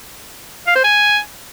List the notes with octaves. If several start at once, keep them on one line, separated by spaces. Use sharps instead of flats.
F5
C5
G#5